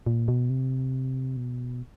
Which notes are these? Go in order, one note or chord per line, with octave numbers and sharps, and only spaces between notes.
A#2
B2
C3
B2